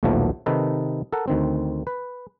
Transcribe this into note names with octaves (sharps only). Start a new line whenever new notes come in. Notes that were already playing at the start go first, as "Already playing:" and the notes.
A#1 D#2 B2 F3 F#3 A3
C3 D#3 D#4 A4 B4
A4 A#4 F#5
D2 D#3 C4
B4